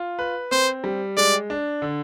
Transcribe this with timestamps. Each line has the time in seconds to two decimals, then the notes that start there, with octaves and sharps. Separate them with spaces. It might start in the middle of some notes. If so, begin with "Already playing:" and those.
Already playing: F4
0.19 B4
0.51 C4 C5
0.84 G3
1.17 G#3 D5
1.50 D4
1.82 D3